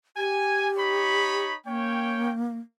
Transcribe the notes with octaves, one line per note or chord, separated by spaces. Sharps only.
G4 G#5
D#4 C#5 B5
A#3 C#4 C#5 G5